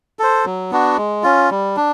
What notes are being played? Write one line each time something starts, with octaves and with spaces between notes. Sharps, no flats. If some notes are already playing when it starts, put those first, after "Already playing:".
A4 C5
F#3
B3 D4 F#4
G#3
C#4 F4
G3
D4